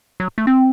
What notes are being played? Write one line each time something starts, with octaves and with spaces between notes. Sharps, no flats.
F#3
A3
C4